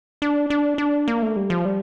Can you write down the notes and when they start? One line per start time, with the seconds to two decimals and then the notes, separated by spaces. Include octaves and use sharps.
0.22 D4
0.50 D4
0.78 D4
1.08 A#3
1.22 A3
1.36 G3
1.50 F3
1.65 G3